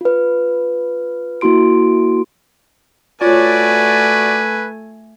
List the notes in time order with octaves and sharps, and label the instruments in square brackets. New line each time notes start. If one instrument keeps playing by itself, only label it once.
[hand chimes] F4 B4
A#3 E4 F#4 C6 D7
[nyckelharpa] A3 G#5 [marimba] F4 C#5 [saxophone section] F#4 D5 [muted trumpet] B4